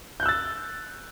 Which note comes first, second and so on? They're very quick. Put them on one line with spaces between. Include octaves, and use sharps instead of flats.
G6 F#6 E6 A6